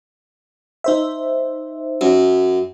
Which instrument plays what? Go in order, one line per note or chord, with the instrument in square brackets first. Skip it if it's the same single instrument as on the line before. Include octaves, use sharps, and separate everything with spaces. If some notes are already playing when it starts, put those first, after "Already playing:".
[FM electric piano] D#4 C5 E5
[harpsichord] F#2